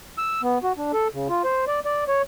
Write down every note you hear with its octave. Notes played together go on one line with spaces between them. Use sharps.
E6
B3
F#4
D4
A4
C#3
F4
C5
D5
D5
C#5